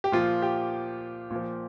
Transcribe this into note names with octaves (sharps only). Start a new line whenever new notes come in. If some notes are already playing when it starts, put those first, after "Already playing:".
G4
A#2 F3 F4
G4
A#2 F3